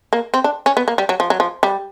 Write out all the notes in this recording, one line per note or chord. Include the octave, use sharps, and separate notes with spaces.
A#3
C4
D4
C#4
B3
A#3
G3
F#3
F3
F#3
F3
G3